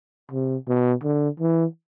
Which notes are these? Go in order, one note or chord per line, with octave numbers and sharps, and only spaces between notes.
C3
B2
D3
E3